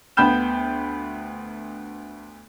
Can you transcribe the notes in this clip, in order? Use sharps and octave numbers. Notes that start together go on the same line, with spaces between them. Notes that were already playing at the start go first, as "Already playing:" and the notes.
D2 B3 G5 B5 G6 E7